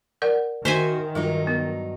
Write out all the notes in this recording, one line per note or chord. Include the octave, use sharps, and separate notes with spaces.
A#4 D5 F#5
D#3 F#4 C5 E5 G#5
G2 F#3 G3 D#4 F4
B3